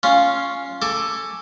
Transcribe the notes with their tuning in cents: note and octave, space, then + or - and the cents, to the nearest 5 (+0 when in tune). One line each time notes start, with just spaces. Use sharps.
C#4 +0 F4 +0
A4 +15 G#5 +0 D6 +0